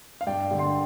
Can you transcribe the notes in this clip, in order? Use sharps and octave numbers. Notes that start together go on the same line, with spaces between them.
F5
G2 D5 G5
D3 G3
G5 C6